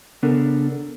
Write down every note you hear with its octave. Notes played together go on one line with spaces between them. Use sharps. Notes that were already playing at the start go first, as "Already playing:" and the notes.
C#3 B3 D4 A4 A#4